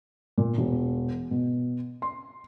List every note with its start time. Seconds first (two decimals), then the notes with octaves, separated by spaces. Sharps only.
0.38 A#2
0.58 E1
1.31 B2
2.02 C6